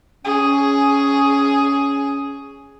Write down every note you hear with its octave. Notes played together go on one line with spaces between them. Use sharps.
C#4 G#4